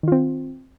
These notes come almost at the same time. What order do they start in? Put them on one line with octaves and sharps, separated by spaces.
D#3 F4 C4